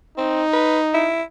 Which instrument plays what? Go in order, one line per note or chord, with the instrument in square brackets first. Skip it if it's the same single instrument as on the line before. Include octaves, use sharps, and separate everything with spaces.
[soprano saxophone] C4 [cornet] D#4
[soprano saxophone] B4
E4